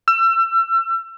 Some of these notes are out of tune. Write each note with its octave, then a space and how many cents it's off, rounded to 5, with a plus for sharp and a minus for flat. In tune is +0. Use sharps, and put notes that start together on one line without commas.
E6 +35